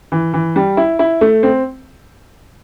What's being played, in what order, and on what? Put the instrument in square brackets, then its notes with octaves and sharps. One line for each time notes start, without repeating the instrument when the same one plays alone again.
[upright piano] E3
E3
G3
E4
E4
A3
C4